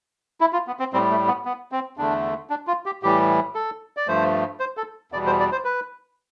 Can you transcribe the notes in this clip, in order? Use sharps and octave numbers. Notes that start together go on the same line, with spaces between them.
E4
F4
B3
C4
A2 G3 C4
A3
B3
B3
C4
E2 D3 A3 D4
D4
F4
G4
A2 E3 G3 G4
A4
D5
G2 F3 A3 C5
C5
A4
E2 B2 G3 D5
C5
D5
C5
B4